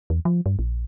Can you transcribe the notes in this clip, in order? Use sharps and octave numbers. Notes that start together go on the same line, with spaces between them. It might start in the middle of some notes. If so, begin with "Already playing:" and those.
E2
F3
G2
A#1